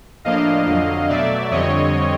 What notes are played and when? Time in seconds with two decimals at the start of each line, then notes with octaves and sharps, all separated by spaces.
0.25 A2 F3 A#3 D4 D#5 F5
0.67 F2 D3 F#3
1.09 B2 F#3 A3 D5 E5
1.51 F2 D3 G3 C4 C#5 D#5